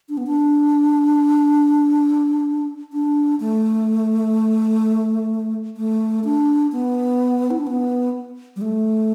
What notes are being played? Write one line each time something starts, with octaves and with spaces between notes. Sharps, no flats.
D4
B3
D4
D4
A3
A3
D4
B3
E4
D4
B3
G3
A3